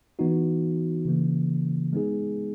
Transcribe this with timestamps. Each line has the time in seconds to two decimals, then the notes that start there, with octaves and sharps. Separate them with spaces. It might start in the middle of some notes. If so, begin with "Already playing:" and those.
0.19 E3 B3 D#4 F#4
1.05 C#3 E3 A#3
1.93 G#3 B3 D#4 G#4